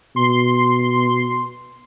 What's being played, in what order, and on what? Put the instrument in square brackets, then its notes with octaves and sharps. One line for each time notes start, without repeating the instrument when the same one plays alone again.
[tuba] B2 [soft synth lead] C6